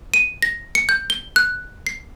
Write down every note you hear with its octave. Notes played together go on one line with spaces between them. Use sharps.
D#7
A#6
C#7
G6
G7
F#6
C7